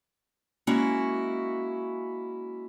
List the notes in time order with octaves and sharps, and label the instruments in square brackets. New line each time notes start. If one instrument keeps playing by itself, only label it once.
[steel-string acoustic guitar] G#3 A#3 C#4 E4 F#4